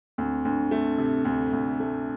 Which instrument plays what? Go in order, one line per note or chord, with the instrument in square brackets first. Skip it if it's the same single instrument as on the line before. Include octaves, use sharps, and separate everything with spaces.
[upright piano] D2 [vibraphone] C4
[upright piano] D2 [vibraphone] D4
[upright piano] A3 [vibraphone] C4
[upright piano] C3
D2
D2
A3